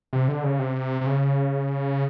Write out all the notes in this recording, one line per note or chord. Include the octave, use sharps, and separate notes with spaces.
C3
D3
C#3
C3
C3
C#3